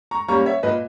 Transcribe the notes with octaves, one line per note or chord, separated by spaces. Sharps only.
A#5 C#6
G3 A#3 C#4 A#5 C#6
C#5 E5
A#2 B4 D#5